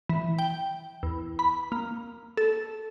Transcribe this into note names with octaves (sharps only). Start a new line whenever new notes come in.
E3
G5
E2
B5
A#3
A4